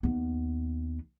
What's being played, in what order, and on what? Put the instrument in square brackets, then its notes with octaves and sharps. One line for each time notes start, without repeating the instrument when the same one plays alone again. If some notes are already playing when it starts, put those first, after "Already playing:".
[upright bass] D#2 B3